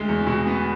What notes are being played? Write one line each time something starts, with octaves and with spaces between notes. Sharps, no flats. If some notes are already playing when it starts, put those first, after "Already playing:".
Already playing: D2 G#3
E2
B2
B3